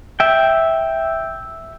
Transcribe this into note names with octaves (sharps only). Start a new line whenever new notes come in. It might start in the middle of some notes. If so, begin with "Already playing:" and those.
E5 G5